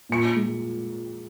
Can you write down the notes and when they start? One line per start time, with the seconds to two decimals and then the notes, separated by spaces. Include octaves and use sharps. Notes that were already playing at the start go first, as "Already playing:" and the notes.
0.09 A#2 C#7
0.36 G#3